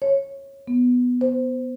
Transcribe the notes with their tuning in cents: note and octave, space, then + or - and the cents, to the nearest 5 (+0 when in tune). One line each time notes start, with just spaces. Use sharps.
C#5 -15
B3 +0
C5 -15